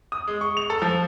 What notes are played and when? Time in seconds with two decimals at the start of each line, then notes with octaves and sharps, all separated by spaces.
0.12 D#6
0.27 G#3
0.41 C#6
0.57 F7
0.70 A4
0.82 F3